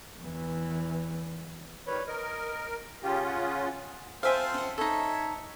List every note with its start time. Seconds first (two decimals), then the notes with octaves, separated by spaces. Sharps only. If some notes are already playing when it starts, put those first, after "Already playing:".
0.20 E2 E3
1.87 D#3 G3 B4 C#5 B5
2.08 A#4 D#5
3.03 C#3 C#4 F4 G4
3.26 F#5
4.23 C4 F4 A4 C5 E5 F5 G5 G#5
4.54 C#4 F#5
4.78 D#4 A4 C#5 E5